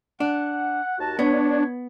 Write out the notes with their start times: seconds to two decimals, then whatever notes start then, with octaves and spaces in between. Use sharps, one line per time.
0.20 D4 F#5
0.98 D#2 F#4 A5
1.19 B3 D4 C#5